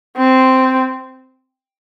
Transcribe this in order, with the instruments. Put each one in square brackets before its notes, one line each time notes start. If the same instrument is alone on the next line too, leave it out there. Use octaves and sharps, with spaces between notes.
[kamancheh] C4